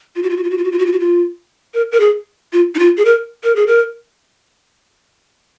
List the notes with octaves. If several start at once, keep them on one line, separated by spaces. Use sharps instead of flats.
F4
F#4
F4
F#4
F4
F#4
F4
F#4
F4
F#4
F4
F#4
F4
A#4
A#4
G#4
F4
D#4
F4
G#4
A#4
A#4
G#4
A#4